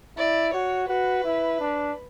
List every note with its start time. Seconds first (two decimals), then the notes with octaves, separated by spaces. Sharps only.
0.17 E4 D5
0.54 F#4 C#5
0.89 F#4 B4
1.24 E4
1.60 D4